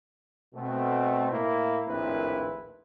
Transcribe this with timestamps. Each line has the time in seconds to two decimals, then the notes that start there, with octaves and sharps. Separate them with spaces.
0.54 B2 A3 C4
1.30 A2 A#3 E4
1.87 A#1 D#2 A2 C4 E4 B4